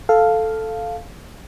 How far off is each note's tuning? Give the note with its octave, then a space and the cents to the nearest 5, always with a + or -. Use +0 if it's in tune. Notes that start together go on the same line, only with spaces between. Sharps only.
A4 +0 F5 +0